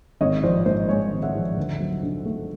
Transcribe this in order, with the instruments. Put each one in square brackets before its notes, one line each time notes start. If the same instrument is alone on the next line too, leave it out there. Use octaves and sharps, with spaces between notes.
[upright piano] G#1 C#5 D#5
F3 C5 D5
G#2 C5
G#3 C#5
G#1
E5 F#5
F3
D2
F#3
D3
A3